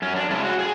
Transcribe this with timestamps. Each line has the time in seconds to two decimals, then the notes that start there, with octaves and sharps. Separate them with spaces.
0.02 F#2 C#4
0.16 D4
0.30 C#3 G#3 C#4 E4
0.45 F#4
0.59 A2 G#4